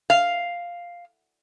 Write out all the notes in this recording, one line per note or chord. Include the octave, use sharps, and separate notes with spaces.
F5